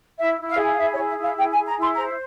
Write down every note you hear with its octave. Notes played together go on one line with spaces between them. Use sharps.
E4 E5
E4
F5
G#4
F5
E4 E5
C#5
G#4
E5
E4
F5
G#4 G5
G#5
G#4
A#5
E4 C6
C5 A#5